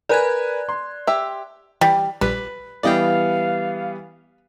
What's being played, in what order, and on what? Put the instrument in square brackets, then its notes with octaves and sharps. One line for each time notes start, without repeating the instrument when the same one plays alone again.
[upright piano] A#4 B4 G#5 [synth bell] D5 F#6 G#6
[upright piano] C6
[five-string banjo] G4 E5
[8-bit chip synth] E3 [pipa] G3
[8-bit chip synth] A#1 G3 [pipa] B4
[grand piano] E3 G3 B3 [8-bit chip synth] D5 D#5 G5 [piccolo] F5